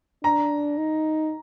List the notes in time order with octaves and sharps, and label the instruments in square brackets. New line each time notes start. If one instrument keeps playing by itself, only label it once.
[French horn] D4 [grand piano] A#5
[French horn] D#4